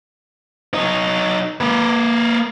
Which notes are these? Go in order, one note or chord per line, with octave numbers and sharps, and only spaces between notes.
F#3 D#4
A#3 B4